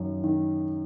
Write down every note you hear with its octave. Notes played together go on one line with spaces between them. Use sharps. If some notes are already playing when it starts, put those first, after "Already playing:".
Already playing: F#2 D#3
D#3